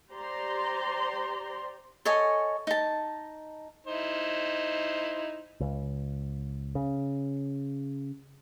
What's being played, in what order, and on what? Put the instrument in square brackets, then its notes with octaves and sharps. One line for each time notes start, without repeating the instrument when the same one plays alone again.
[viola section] G4 C5 D5 A#5 C6
[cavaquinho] A4 C#5 D#5 G#5
D#4 A5
[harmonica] D#4 E4 C5
[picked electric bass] C#2
C#3